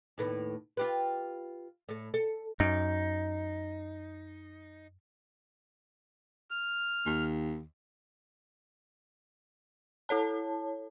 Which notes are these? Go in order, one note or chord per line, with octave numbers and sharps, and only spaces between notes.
D#2 A2 B3
F4 G4 B4
A2 A4
A4
F#2 D#4
F6
D#2
E4 A4 C#5 A5